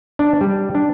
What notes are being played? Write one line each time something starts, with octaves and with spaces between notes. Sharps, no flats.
D4
G3
D4